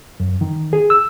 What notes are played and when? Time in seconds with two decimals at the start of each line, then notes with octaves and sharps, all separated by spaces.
0.20 F#2
0.41 D#3
0.73 G#4
0.90 E6